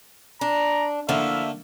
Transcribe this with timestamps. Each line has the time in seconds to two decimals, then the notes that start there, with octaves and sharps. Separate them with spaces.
0.41 D4 A#5
1.09 D3 F3 A3 A#3 E4 E5